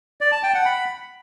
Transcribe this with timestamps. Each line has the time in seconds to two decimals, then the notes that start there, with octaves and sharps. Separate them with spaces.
0.21 D5
0.32 A5
0.43 G5
0.54 F#5
0.65 B5